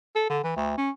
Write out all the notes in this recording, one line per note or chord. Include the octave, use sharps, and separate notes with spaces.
A4
D3
E3
D2
C#4